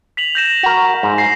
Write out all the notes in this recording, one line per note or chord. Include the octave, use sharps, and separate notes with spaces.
B6 F7 F#7
G6 A#6 E7
F#4 A#4
G#2
A#6 C7